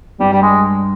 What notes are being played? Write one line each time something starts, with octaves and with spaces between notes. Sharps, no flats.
G2 G3
G3
G#3